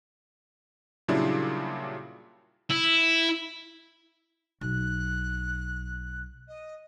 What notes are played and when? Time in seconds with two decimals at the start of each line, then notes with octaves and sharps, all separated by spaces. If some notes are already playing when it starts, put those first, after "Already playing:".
1.08 A#2 C#3 F#3 G3 D4 E4
2.70 E4
4.61 B1 F#6
6.48 D#5